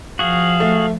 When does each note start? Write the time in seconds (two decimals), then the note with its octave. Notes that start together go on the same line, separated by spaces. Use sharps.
0.19 F3 F#4 G#4 F5
0.60 A3